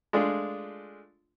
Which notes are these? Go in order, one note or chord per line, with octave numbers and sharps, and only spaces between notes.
G#3 A3 D4 F4 G#4